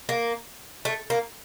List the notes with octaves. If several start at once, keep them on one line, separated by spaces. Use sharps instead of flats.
A#3
A3
A#3